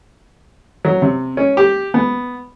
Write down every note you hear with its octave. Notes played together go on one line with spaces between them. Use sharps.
F#3
C3
C#4
G4
B3